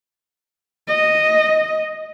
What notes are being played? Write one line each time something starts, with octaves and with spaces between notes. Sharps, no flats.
D#5